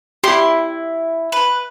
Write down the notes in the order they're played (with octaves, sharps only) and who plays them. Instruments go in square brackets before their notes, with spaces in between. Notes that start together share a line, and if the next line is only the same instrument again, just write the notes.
[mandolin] E4 [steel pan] G4 C6
[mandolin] B4